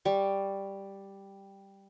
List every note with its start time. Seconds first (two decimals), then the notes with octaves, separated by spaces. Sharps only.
0.05 G3 C#6